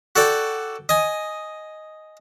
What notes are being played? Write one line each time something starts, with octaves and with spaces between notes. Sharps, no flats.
F#4 A4 D5 G5
D#5 G#5